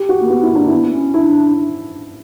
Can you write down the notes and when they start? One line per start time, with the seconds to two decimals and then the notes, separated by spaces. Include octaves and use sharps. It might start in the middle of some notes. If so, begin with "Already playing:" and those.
Already playing: G4
0.09 F#4
0.21 A#3
0.30 B3 F#4
0.43 E4
0.50 A#3
0.55 D4
0.67 B3 E4
0.93 C#4
1.14 D4 E4